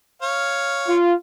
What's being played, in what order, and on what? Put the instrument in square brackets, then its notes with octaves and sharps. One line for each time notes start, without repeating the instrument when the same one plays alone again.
[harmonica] C#5 F5
[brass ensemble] F4